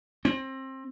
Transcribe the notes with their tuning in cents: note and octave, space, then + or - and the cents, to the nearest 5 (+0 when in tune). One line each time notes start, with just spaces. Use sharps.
C4 +25